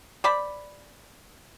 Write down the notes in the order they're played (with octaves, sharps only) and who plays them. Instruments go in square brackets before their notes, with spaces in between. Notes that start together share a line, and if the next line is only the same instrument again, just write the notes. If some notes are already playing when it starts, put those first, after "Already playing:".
[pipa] C5 D5 B5